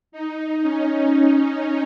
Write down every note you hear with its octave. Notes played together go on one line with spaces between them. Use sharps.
D#4
C#4